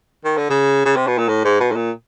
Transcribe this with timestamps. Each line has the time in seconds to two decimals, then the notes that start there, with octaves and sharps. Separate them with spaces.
0.24 D#3
0.37 D3
0.50 C#3
0.85 C#3
0.96 C3
1.07 B2
1.18 A#2
1.28 A2
1.44 G#2
1.60 B2
1.71 A2
1.76 A#2